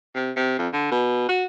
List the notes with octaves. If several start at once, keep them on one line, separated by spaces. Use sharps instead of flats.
C3
C3
F2
D3
B2
F#4